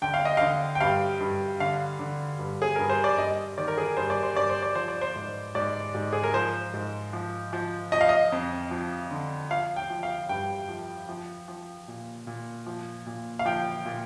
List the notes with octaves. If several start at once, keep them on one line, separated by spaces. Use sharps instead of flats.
D3 G5
F5
D#5
D3 F5
G5
G2 F5
G2
D3 F5
D3
G2
G#4
G2 A#4
C5
D5
G2 D#5
D#3 D5
A#4
G#4
G2 C5
D5
C5
G2 D5
C5
D5
F3 C5
D5
C5
G#2
G#2 D5
G#2
G#4
A#4
F3 C5
G#2
F3
F3
F3 D#5
F5
D#5
F2
F3
D3
F3 F5
G5
F3
F5
G2 G5
F3
F3
F3
A#2
A#2
F3
A#2
F5
F3 G5
A#2